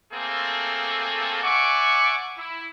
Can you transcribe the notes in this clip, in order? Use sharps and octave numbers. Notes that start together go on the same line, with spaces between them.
A3 A#3 C4 G#4 A4
D5 E5 F#5 G#5 C#6 D6
E4